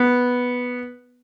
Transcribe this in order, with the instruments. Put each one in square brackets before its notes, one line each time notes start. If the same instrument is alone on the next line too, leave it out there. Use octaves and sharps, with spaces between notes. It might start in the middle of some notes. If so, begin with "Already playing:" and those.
Already playing: [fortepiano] B3